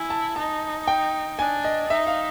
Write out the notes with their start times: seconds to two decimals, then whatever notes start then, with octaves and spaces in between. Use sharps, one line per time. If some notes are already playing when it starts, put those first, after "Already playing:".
Already playing: E4 G#5
0.10 A5
0.36 D#4 A5
0.88 G5
1.38 D4 G#5
1.64 D#5
1.90 D#4 E5
2.07 F5